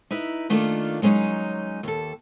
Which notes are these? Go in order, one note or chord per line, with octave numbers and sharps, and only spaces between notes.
D#4 E4 B4
D#3 A3 A#3 D4 F4
F#3 G#3 C4 C#4 D#4
D#2 A4